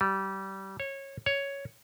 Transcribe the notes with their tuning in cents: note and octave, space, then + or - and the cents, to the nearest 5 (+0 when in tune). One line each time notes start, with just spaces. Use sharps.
G3 -25
C#5 -20
C#5 +5